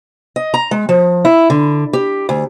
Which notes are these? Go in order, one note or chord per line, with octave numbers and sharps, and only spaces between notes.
D#5
A#5
G#3
F3
E4
D3
G4
D2